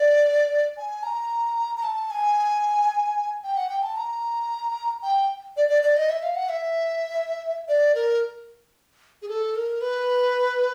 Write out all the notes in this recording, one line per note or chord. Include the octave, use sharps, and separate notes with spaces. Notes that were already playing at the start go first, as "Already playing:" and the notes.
Already playing: D5
G#5
A#5
A#5
A5
G#5
G5
F#5
G5
A5
A#5
G5
D5
D5
D5
D#5
E5
F5
F#5
E5
D5
A#4
G#4
A4
A#4
B4